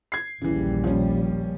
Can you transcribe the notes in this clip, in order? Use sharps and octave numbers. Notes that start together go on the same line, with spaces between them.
G#6 C7
A#1 D#2 C#3 E3 G3
F3 C#4